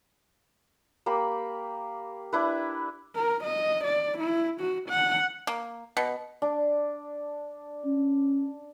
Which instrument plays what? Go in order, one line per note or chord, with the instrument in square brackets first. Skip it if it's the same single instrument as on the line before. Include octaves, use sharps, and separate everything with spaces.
[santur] A#3 G4 B5
D4 E4 B4
[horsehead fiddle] A#4
D#5
D5
E4
F#4
F#5
[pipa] A#3
B2
[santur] D4
[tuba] C#4